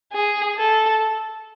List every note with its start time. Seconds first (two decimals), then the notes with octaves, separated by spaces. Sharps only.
0.13 G#4
0.58 A4